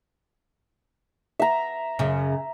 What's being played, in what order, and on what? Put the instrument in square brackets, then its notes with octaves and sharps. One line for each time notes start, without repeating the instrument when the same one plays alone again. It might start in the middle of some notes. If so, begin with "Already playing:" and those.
[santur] E5 A#5
[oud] F#2 C#3